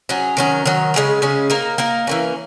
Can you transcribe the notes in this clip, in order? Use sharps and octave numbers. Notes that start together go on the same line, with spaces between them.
F#3 C#4 G#4
D#3 F#3 C#4
D#3 F#3 C#4
C#3 G#3 C#4
C#3 G#3 C#4
A#3 D#4 A#4
A#3 D#4 A#4
E3 A#3 C#4